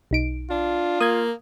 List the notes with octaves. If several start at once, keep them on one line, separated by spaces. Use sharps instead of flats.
B1 D#4 D7
D4 F4
A#3 D#6 G#6